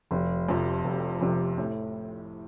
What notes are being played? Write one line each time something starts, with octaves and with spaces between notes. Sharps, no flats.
F1
F2 C3
F1
F2 C3
A2